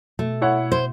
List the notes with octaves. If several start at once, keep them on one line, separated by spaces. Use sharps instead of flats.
B2 A3
E4 C#5 F#5
C5